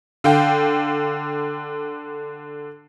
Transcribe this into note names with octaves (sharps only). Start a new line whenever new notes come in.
D3 F5 G5